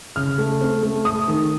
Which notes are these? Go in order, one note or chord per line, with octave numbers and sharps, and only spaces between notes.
C#3 F6
A3
C4
A3
A3 D#6
D#3